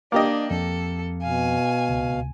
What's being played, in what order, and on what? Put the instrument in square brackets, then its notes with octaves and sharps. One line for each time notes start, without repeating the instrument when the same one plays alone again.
[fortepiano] A#3 G4 D#5 [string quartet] D4
[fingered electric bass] F2 F3 C4 [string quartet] A4
[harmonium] B2 F5 [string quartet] G#5
[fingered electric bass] D1 C#2 C3